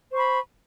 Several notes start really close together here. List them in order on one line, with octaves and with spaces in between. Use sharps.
C5 C#6 B5